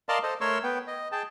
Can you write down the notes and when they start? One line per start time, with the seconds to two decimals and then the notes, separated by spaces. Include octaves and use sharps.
0.09 A#4 D5 D#5 F5 A5 C6
0.23 A4 C5 D#5
0.41 A3 A#4 C#5 C6 C#6 E6
0.63 B3 G5
0.87 D#5
1.12 G#4 G5 A5